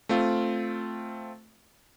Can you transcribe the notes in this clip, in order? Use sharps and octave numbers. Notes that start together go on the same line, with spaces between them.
A3 C4 F4